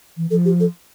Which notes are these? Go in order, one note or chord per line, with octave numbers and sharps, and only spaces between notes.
E3
F3 A4
G4
A4